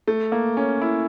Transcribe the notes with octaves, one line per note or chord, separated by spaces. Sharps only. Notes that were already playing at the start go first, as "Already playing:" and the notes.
A3
A#3
C#4
E4